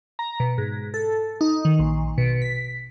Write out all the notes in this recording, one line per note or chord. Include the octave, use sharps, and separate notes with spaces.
A#5
B2
G#2
A4
D#4
D#3
A#1
B2
B6